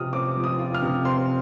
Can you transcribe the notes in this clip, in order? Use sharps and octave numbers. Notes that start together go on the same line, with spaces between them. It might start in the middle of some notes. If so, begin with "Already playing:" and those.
Already playing: C3 F3 C4 F4 D#6 F6
C4 D6
F3
D#6
F4
F6
C3
C4 C6